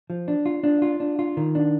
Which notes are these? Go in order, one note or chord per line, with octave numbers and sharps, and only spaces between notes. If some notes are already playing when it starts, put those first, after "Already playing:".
F3
D4
F4
D4
F4
D4
F4
D#3
D4